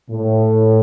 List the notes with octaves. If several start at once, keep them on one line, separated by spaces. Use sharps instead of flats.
A2